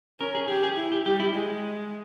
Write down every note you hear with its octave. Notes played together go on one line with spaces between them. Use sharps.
C#4 A#4
G#4
G4 G#4
G#4
E4
G4
G3 G4
E4
G#3